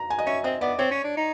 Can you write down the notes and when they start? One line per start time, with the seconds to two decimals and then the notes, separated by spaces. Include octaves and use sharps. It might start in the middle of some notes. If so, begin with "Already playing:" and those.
Already playing: A#5
0.10 G#5
0.19 D#5
0.26 C#4 E5
0.44 C4 D#5
0.61 B3 D5
0.78 C4 C#5
0.91 C#4
1.04 D4
1.17 D#4